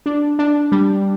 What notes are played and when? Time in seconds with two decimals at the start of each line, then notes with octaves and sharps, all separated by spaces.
0.06 D4
0.39 D4
0.72 G3